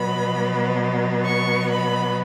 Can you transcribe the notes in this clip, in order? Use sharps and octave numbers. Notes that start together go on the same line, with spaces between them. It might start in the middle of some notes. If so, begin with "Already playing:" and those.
Already playing: B2 F#3 B3 B5
C#6
B5